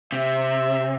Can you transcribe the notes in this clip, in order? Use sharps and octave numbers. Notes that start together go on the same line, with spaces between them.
C3 E5